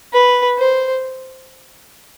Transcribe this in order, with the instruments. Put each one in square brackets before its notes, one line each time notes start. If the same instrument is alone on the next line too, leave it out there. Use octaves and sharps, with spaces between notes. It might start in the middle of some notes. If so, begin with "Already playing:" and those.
[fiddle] B4
C5